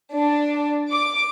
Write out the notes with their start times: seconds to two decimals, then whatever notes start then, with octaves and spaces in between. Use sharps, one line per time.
0.13 D4
0.91 D6